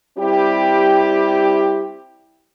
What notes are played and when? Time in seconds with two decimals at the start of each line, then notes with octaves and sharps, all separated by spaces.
0.18 G3 C4 E4 G4